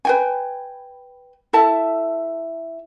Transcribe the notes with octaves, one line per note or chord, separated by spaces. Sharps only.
B4 G5 G#5
E4 A4 E5 A5